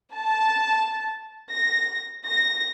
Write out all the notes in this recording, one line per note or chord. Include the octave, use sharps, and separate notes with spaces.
A5
A#6
A#6